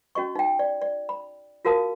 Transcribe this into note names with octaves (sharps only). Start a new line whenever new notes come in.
C#4 F#4 D#5 C#6
D#4 G5
D5
D5
B5
F4 F#4 A#4 F5 A5 D#6